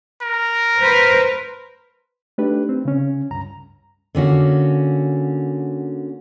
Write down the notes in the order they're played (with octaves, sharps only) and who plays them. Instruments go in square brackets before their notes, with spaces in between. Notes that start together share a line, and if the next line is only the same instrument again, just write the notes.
[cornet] A#4
[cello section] B4 C5
[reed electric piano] A3 D4 D#4 G4 B4
C4
C#3 C#4
C#2 G2 A#5
[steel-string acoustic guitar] D3 A#3 C#4 F#4